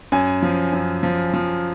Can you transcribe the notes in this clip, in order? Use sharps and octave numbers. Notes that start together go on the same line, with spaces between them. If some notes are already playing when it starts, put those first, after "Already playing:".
F#2 G#5
F3
F#2
F3
F3